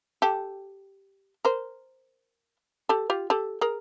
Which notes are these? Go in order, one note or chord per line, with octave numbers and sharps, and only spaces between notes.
G4 A4
A#4 C5
G4 A4
F4 G4
G4 A4
G#4 A#4